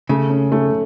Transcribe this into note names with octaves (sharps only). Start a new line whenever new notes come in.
C#3 A3
C#4
A3